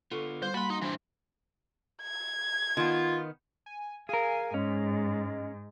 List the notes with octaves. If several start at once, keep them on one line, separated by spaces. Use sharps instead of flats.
D3 B3 F4 A4 C#6
G3 C5
G3 A#3 F#4 B5 C6
D#4
E3 C4 D4
G#6
D#3 B3 F4
G#5
G#4 A#4 F5 G#5
G#2 G#3 C#4